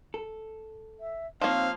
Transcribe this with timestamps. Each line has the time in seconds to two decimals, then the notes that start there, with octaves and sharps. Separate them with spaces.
0.14 A4
1.00 E5
1.41 F3 A#3 C4 D#4 C#5 F5